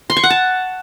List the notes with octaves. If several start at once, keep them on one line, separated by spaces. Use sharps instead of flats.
C6
C#6
F#5
A5